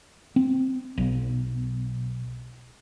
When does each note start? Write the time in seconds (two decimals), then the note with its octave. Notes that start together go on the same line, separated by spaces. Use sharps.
0.36 C4
0.98 B1